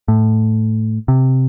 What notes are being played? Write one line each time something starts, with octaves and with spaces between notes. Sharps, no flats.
A2
C3